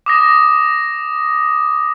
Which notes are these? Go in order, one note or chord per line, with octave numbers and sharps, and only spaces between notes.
D6 D#6 A#6